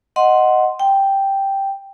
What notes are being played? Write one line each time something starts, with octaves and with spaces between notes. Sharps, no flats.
D#5 F#5 C6
G5